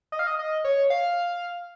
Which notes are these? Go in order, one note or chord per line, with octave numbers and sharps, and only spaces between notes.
D#5
F5
D#5
D#5
C#5
F5